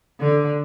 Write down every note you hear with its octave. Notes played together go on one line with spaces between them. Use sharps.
D3